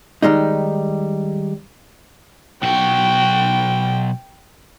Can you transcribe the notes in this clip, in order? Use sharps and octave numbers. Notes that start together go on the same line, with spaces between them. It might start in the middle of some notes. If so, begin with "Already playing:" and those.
D#3 G3 G#3 D#4
B1 F#4 G5